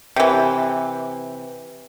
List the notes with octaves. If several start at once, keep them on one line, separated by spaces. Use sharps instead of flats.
C3 E3